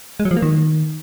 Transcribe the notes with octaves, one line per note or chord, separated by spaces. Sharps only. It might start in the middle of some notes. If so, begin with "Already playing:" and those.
G#3
F#3
F3
A#3
D#3